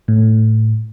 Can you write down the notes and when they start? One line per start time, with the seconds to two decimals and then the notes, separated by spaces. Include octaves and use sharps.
0.08 A2